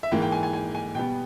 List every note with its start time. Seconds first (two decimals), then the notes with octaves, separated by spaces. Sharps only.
0.03 E5
0.11 G#2 E3 A#3 G5
0.22 G5
0.32 G#5
0.43 G#5
0.53 G#5
0.75 G#5
0.95 B2 G3 B3 G5